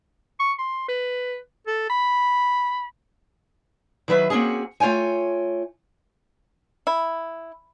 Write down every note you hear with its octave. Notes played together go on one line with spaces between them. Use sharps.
C#6
C6
B4
A4
B5
D#3 F#3 B4 E5
A#3 C4 C#4 F#4 G#4
A3 F4 C#5 G5 G#5
E4